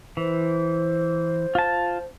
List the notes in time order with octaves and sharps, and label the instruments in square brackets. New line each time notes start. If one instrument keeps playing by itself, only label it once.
[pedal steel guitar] E3 [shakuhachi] C5
[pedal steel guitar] F4 A5